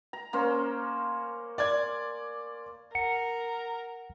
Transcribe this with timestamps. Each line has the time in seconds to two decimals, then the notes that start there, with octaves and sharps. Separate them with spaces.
0.13 A#5
0.33 A#3 C#4 C5
1.58 D5 G#6
2.95 A#4 F#5 C#7